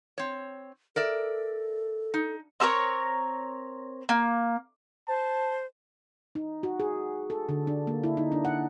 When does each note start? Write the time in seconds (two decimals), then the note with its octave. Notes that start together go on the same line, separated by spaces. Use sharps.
0.18 C4 C#5
0.96 A4 A#4 D5 E5
2.14 D#4
2.60 C4 A4 A#4 C#5
4.09 A#3
5.08 C5 A5
6.35 D#4
6.63 F#4
6.80 G#4
7.30 A4
7.49 D3
7.67 D4
7.87 A#3
8.04 E4
8.17 D#4
8.32 D4
8.45 F#5